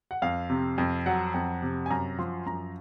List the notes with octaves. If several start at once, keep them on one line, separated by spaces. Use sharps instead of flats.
F#5
F2 F5
C3
F2
F#3 F#5
F2
C3
G#5
F#2 A#5
F3 C6
F#2 A#5